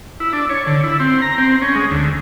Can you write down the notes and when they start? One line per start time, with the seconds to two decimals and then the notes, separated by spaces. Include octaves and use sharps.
0.20 E4
0.33 D4
0.49 C#5
0.67 D3
0.84 E4
1.00 C4
1.22 A#5
1.38 C4
1.62 C#4
1.75 G#3
1.91 D2